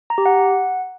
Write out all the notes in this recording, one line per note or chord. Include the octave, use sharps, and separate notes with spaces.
A#5
G4
F#5